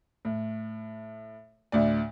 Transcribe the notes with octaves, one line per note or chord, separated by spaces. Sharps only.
A2
D2 A2 D5